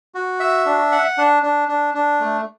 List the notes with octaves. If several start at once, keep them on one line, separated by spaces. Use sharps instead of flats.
F#4
E5
D4
F#5
D4
D4
D4
D4
A3